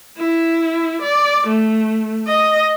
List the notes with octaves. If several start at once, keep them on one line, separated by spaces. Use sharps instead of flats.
E4
D5
A3
D#5